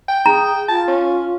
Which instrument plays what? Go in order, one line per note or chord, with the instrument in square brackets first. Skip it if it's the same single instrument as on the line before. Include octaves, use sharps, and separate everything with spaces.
[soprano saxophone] G5
[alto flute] G#4 [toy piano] A#5
[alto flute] F4 [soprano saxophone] A5
[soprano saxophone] C#4